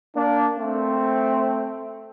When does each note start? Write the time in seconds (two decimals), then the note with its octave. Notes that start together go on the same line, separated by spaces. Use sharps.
0.16 A#3 D4
0.58 A3 C4